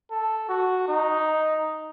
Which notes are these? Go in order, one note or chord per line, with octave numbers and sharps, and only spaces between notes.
A4
F#4
D#4